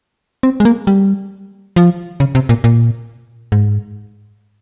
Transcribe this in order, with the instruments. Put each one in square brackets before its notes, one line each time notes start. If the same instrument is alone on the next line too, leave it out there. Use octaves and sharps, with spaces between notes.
[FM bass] C4
G#3
A#3
G3
F3
C#3
C3
A#2
A#2
G#2